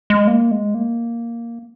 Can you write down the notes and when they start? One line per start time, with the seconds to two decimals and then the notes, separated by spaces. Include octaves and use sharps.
0.10 G#3
0.27 A#3
0.51 G#3
0.74 A#3